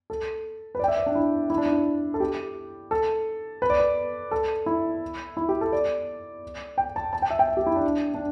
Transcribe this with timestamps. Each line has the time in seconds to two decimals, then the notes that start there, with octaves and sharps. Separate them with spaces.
0.10 A4
0.75 B4
0.79 D5
0.84 G5
0.88 E5
0.98 D5
1.06 D4
1.15 E4
1.50 E4
1.58 D4
1.66 E4
2.14 A4
2.20 G4
2.91 A4
3.62 B4
3.70 D5
3.80 B4
4.31 A4
4.66 E4
5.37 E4
5.49 G4
5.61 A4
5.73 D5
6.78 G5
6.96 A5
7.13 A5
7.22 G5
7.30 E5
7.39 G5
7.48 E5
7.57 G4
7.67 E4
7.76 D4
8.14 D4